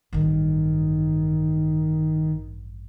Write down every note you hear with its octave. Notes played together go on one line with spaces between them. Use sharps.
A1 G2 D#3